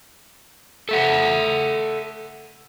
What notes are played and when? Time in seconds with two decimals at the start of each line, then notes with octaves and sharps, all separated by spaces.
0.89 A4 E5 F#5